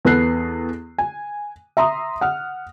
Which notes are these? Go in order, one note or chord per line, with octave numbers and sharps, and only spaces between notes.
E2 B3 A4 F#6 C7
G#5
E5 A#5 C6 D#6
F#5 F6